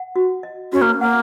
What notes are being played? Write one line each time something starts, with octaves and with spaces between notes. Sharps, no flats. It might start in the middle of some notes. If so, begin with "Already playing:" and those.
Already playing: F#5
F#4
D#5
C#4 F#4
A#3
A#3 F#5